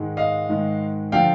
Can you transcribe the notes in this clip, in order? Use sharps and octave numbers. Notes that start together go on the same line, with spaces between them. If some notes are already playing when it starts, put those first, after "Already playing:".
Already playing: G#2 D#3 G#3
D#5 F5
G#2 D#3 G#3
D3 F3 F5 G5